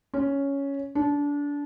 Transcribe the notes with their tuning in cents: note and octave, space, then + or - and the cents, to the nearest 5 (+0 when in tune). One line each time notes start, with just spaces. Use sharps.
C#4 +5
D4 -25